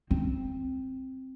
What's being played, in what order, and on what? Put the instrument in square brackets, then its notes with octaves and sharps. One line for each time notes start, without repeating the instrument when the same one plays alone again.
[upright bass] C4